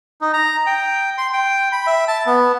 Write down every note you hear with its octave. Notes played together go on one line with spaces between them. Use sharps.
D#4
A#5
G5
C6
G5
B5
E5
A5
B3